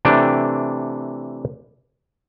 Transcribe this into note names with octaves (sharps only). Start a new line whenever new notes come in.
C3 E3 A3 D4 G5